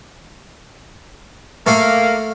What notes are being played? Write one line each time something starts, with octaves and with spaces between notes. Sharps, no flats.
A3 A#3 A4 F5